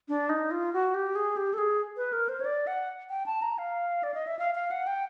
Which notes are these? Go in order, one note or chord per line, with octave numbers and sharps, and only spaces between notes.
D4
D#4
F4
F#4
G4
G#4
G4
A4
G#4
B4
A#4
C5
C#5
D5
F#5
G5
A5
A#5
F5
D5
D#5
E5
F5
F5
F#5
G5